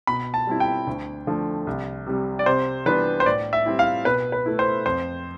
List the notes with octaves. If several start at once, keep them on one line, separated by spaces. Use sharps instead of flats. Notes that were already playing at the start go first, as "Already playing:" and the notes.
B2 B5
A5
G3 C4 E4
G5
D2
D3 F3 A3
C2
C3 G3
D5
C3 C5
E3 G3 B3 D4 B4
C5
A2 D5
E5
G3 C4 E4
F5
B2 B4
B4
A3 E4
C5
F2 C5